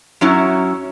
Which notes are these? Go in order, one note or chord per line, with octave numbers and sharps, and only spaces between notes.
F#2 F#3 C#4 E4